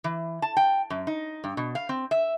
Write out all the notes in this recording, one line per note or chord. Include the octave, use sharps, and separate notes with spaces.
E3
A5
G5
F#2
D#4
G2
B2
F5
C4
E5